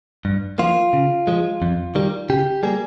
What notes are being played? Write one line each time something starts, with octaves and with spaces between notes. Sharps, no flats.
G2
F3 A#3 F4
C#3
F3 G#3
F2
D#3 G3
C#3 G4
G3 A#3 G#4